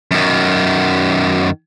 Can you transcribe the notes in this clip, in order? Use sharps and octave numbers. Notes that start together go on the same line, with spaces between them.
F#2 D#3